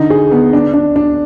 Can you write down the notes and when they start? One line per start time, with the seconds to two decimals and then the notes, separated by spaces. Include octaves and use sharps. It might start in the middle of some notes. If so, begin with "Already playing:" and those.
Already playing: D3 D#4
0.10 G#4
0.31 B3
0.53 D4
0.74 D4
0.96 D4